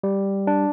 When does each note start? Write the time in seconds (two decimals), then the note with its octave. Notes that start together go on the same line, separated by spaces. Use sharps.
0.03 G3
0.47 D4